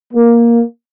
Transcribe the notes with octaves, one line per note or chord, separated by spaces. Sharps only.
A#3